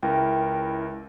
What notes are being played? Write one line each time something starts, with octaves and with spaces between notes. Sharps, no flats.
C#2 E4 A#4 G5